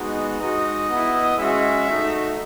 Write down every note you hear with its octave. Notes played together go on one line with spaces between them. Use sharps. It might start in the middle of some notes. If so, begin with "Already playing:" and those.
Already playing: G#3 B3 D#4 F#4
G#3 D#4 F#4 D#5
B3 E4
G#3 C#4 F#4 E5
A3 D#4 F#4